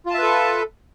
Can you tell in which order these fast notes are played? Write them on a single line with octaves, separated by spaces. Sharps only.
F4 A5 E5 B4 A4